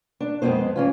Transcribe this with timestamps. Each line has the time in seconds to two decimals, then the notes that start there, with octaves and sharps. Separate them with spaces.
0.20 D4
0.42 F2 G#3 B3 C4 D#4 C5
0.76 E3 C#4 F4